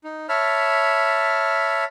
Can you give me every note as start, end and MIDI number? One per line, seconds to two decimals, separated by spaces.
0.04 0.27 63
0.29 1.84 73
0.29 1.84 76
0.29 1.84 81
0.29 1.84 83
0.29 1.84 89